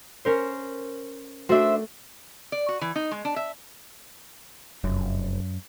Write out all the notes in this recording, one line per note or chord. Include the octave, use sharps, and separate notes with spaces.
C#4 A#4 C5
A3 D4 F#4 C5 E5
D5
F#4
E3
D#4
G#3
D4
E5
F1 F#2